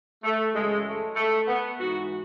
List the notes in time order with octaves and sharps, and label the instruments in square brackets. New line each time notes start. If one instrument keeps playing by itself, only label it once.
[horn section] A3
F#2 C#3 E3 G#3
A3
A3
B3
G#2 E3 F#4